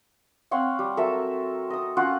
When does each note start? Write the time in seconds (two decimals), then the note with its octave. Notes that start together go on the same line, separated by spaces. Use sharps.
0.51 C4 C#5 F5 F#5
0.79 G3
0.97 F#3 A4 A#4 E5
1.70 D#5 D#6
1.97 C#4 F4 F#5